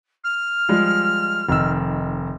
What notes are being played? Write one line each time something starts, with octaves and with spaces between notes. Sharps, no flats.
F6
F3 G3 G#3
F1 D#3 E6